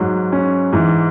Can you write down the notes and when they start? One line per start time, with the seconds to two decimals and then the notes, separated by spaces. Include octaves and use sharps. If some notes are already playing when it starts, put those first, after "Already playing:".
Already playing: G#2 F#3
0.32 C#4
0.73 G#2 E3